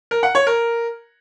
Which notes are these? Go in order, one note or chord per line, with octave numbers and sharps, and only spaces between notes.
A#4
F#5
C#5
A#4